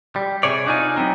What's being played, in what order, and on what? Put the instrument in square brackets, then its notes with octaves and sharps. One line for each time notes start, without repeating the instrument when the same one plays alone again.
[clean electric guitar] G3
C3 G#4 C#5 D5
D4 D#4 F4 G#5
F#3 B3 C4 D#4